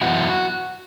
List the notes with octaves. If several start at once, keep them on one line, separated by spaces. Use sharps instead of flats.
F#2 E3 B3 E4 F#4